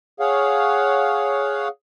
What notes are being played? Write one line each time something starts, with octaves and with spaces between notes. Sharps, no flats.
G#4 C#5 F5 F#5